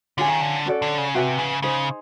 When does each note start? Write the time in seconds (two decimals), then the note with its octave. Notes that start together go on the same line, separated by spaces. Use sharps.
0.17 D3 C#4 F4 G#4
0.29 D#3
0.41 D3
0.66 C#4 F#4 A4 D5
0.82 D3
0.98 C#3
1.15 C3 F#4 B4 E5 G#5
1.39 C#3
1.62 C#3 D#4 G#4 C5